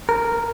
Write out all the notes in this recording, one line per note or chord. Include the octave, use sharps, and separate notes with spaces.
A#4